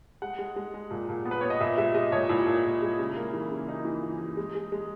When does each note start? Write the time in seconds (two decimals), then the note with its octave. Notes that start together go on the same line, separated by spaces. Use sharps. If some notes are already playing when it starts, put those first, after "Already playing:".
0.22 G#3 F#5
0.39 G#3
0.56 G#3
0.74 G#3
0.91 A#2
1.09 A#2
1.25 B3
1.31 B4
1.41 B3 C#5
1.50 D#5
1.60 A#2 E5
1.78 G#3 E5
1.94 G#3 D#5
2.12 A#2 C#5
2.29 A#2 E4
2.46 A#2
2.64 A#2
2.82 G#3
2.99 C#3
3.16 A#3
3.33 E3
3.51 C#3
3.68 A#3 D#4
3.85 E3
4.03 E3
4.21 E3
4.37 G#3
4.55 G#3
4.72 G#3